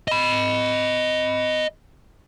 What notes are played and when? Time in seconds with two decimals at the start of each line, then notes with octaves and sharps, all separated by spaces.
0.08 D#5 B5